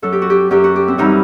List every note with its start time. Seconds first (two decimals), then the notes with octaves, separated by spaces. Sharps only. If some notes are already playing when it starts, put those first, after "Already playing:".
0.02 F#2 F#3 A4
0.12 G4
0.22 F#4
0.30 G4
0.51 F#2 F#3 G4
0.64 F#4
0.76 G4
0.88 C4
0.98 F#2 E3 G3 D#4